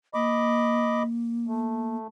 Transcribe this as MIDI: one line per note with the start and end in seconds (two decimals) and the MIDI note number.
0.14 1.97 58
0.14 1.03 75
0.14 1.03 83
0.14 1.03 86
1.47 2.07 57